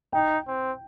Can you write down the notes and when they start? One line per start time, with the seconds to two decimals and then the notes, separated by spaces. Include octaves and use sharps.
0.13 D#4 G5
0.48 C4